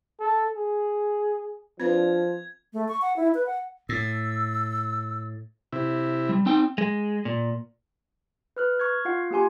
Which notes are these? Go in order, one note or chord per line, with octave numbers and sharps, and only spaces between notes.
A4
G#4
F3 C4 D4 F4 B4 D5 G#6
A3
C#6
F#5
E4
B4
F#5
A2 E6
C3 E4
G3
C4 D#4 G5
G#3
A#2
B4 F6 F#6
C#6 F6 G#6
F4 F5 F#5
A#3 F#4 G4 G#5 C6